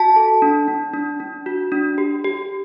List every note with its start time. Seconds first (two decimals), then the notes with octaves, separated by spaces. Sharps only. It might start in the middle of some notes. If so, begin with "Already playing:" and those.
Already playing: F#4 A5
0.16 A4
0.42 D4
0.68 D4
0.94 D4
1.20 D4
1.46 F#4
1.72 D4
1.98 G4
2.24 G4